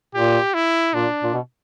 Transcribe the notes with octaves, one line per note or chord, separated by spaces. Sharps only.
A#2 G4
E4
A#2 D4
A#2
B2